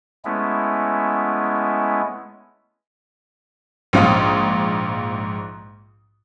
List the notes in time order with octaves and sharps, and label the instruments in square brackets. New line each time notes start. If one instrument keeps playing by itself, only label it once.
[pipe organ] G#3 A3 B3 C#4 E4
[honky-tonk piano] A#1 G#2 F5 D#6